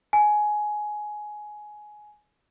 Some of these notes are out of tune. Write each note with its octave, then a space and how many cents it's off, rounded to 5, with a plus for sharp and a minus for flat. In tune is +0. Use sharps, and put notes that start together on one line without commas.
G#5 +15